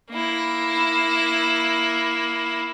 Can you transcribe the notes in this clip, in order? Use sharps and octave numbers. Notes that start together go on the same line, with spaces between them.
A#3 E4